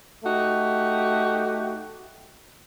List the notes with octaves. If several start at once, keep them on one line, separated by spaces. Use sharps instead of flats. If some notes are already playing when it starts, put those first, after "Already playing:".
A3 D#4 F#4 G4